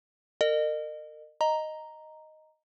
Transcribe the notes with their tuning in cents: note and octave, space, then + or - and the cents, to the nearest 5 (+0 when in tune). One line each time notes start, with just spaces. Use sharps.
A#4 -35 D#5 -35
D#5 +0 A#5 +0